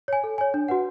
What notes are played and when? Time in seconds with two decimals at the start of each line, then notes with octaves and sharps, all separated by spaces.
0.08 C#5 G#5
0.24 A4
0.38 C#5 G#5
0.54 D4
0.68 F#4 B4 F#5